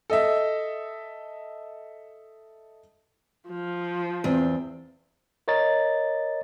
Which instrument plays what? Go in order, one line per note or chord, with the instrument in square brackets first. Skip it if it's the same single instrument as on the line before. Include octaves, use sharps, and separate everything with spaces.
[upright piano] A4 D#5 E5
[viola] F3
[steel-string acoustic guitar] E2 C4
[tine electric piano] A#4 C#5 D#5 A#5 A6